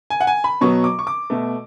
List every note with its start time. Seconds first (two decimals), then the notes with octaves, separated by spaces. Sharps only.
0.10 G#5
0.20 F#5
0.27 G#5
0.44 B5
0.61 B2 F#3 B3 C#6
0.84 D6
0.99 C#6
1.07 D6
1.30 B2 A3